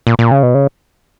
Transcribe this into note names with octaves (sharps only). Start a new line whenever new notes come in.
A#2
A#2
C#3
B2
C#3